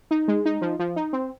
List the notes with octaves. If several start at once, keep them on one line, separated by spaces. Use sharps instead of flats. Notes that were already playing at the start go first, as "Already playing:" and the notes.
D#4
G#3
D#4
F3
F3
D#4
C4